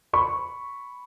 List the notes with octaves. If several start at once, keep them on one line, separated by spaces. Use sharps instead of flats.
B5 C#6